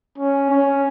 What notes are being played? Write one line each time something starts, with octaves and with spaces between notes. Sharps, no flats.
C#4
C#4